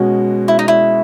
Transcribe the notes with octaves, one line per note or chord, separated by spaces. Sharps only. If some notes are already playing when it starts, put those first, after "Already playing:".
Already playing: B2 G#3 C#4 F#4
E4
D#4
E4